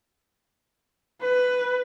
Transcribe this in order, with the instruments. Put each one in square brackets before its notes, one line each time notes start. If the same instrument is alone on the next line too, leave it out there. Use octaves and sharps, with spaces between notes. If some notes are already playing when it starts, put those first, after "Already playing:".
[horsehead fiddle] B4